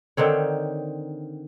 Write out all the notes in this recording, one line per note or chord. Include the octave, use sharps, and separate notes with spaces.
D3 D#3 C4 C#5